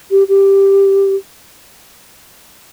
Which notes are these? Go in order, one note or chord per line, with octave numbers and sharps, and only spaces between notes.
G4
G4